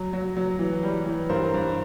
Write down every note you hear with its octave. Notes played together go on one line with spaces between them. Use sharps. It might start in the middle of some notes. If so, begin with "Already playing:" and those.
Already playing: F#3
F#3
F#3
E3
G3
E3
G2 A#4 C5
G2